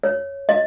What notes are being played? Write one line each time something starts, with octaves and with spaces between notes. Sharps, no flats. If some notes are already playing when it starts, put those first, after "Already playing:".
C#5
D#5